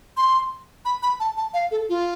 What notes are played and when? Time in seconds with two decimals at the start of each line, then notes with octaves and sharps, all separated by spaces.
0.17 C6
0.85 B5
1.03 B5
1.20 A5
1.37 A5
1.54 F5
1.71 A4
1.89 F4